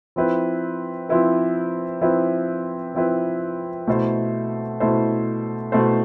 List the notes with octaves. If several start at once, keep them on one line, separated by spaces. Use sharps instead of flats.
F3 C4 E4 B4
F3 C4 E4 B4
F3 C4 E4 B4
F3 C4 E4 B4
B2 A3 E4 A4 C5
B2 A3 E4 A4 C5
B2 A3 E4 A4 C5